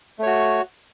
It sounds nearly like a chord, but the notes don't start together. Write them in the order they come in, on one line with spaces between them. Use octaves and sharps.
A3 C#5 F#4